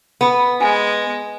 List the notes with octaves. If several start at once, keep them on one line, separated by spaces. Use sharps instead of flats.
B3 B4
G#3 G#5